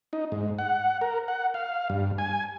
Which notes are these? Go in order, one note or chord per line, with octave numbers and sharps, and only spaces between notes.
D#4
G#2
F#5
A#4
F#5
F5
G2
G#5